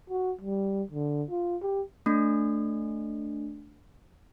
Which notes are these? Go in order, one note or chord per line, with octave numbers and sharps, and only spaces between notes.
F#4
G3
D3
F4
G4
A3 D4